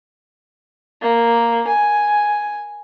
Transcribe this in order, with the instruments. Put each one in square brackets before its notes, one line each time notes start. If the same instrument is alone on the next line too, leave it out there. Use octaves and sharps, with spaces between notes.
[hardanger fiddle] A#3
G#5